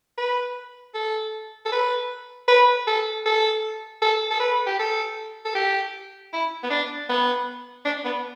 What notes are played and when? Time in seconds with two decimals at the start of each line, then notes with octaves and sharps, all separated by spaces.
0.18 B4
0.94 A4
1.66 A4
1.72 B4
2.48 B4
2.87 A4
3.26 A4
4.02 A4
4.31 A4
4.40 B4
4.67 G4
4.79 A4
5.46 A4
5.55 G4
6.33 E4
6.63 B3
6.70 D4
7.09 B3
7.85 D4
8.05 B3